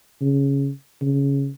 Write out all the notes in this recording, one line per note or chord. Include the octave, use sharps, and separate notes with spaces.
C#3
C#3